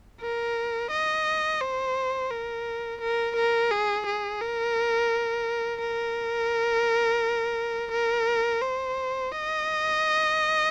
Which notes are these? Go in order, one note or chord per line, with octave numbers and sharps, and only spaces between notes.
A#4
D#5
C5
A#4
A#4
A#4
G#4
G#4
A#4
A#4
A#4
C5
D#5